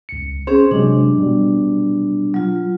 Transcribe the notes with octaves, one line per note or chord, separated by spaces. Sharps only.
C#2 C#7
C4 C#4 G#4 C5
C3 F#3 G#3 D4
B2 G3
F#3 F4